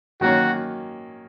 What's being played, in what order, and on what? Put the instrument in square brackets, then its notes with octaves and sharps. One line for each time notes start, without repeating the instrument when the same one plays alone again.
[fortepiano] D#3 F#3 A#3 C#4 [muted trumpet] F#4